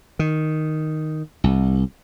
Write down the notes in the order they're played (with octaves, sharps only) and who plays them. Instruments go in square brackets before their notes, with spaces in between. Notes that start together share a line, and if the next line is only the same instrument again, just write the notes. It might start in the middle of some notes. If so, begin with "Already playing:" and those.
[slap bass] D#3
C2